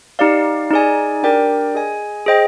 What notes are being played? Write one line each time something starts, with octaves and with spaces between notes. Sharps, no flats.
D#4 G4 D5 F5
D#4 G#4 D5 G#5
D4 G4 A#4 D5 G5
G#4 D#5 G#5
G#4 C5 D#5 G5